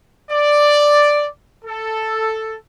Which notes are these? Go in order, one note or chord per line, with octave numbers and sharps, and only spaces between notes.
D5
A4